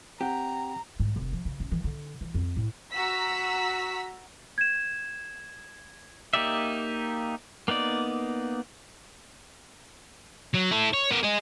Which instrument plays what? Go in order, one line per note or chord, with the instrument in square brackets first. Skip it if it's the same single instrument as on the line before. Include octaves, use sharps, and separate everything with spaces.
[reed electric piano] C4 F#5 [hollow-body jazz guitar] G4 [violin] A#5
[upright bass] G#2
F1
F3
C#3
C#4
E3
D3
E3
F2
A2
[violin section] F#4 A#5 E6 B6
[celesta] G#6 E7
[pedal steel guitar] A#3 D#4 G4 D5 E5
A#3 B3 D#4 D5
[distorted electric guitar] F#3
E4 A4
C#5
B3 A#4
G#4 D#5